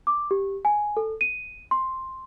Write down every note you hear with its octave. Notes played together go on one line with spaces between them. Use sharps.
D6
G4
G#5
A4
D#7
C6